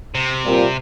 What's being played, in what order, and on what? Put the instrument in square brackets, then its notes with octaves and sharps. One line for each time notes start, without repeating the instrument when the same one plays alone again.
[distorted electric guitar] C3
[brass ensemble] A#2 G3 C4 F4 A#4